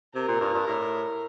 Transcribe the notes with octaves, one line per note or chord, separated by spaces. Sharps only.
C3 A#4
A#2
G2
G2
A2